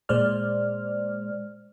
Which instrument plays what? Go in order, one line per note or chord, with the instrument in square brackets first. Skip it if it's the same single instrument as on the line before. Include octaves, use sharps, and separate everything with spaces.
[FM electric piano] A#2 G#3 C5 D5 F6